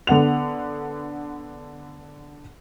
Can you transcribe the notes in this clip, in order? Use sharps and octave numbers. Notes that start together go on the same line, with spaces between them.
D3 B3 F#5 F7